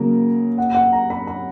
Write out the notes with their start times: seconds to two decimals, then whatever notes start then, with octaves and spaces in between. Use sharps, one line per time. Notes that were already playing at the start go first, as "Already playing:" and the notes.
Already playing: C#3 F#3 A#3 A#4
0.58 F#5
0.75 F#5
0.93 A#5
1.10 B5
1.27 B5